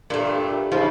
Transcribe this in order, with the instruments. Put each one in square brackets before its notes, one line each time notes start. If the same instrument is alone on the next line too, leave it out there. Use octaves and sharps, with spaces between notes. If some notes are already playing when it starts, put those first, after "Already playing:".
[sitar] G2 [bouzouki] A#2 A3
[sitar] G#2 C#3 [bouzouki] F3